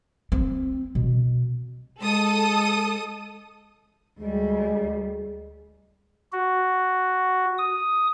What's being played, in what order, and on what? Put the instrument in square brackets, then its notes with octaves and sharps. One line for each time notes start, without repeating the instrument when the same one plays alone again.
[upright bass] C4
B2
[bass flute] G#3 [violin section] A4 D#6
[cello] D2 G3 [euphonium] G#3
[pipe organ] F#4
D#6